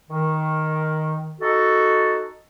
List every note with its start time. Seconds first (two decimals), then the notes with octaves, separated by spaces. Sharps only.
0.09 D#3
1.40 D#4 F#4 A4